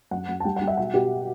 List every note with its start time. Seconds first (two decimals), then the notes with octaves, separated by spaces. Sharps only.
0.11 F#2 F#5
0.29 F#2
0.40 A5
0.44 G3 G5
0.56 F#5
0.61 G3
0.67 E5
0.77 B2 F#5
0.94 B2 G4